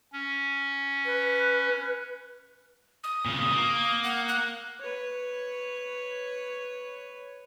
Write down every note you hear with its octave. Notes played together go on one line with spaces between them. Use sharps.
C#4
B4
D#6
A#2 C#3
A#3
F#5
F#6
B4 C#5